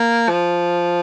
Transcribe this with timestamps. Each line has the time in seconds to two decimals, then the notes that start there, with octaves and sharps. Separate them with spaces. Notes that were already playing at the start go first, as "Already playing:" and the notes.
Already playing: A#3
0.29 F3